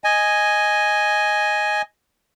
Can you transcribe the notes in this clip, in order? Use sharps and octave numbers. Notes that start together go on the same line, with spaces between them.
D#5 G#5